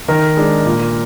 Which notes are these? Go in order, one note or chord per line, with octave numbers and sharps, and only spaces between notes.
D#3 A#4
G#3 D4
A#2